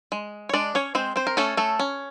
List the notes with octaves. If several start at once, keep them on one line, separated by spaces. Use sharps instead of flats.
G#3
C#5
G#3 D4 D5
C#4 C#5
G#3 C4 C5
C4 C5
A#4
A3 C#4 A4
A3 A4
C#4